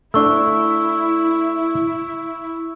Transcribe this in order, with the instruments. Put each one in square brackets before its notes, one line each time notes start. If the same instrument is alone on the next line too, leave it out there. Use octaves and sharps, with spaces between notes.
[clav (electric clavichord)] A3 D4 [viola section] E4 [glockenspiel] C#6 E6